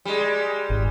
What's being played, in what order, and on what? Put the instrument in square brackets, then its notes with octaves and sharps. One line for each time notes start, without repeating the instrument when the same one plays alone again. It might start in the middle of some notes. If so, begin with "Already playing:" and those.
[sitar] G3 G#3
[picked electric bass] G#1